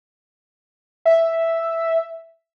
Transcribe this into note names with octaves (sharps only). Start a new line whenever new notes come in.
E5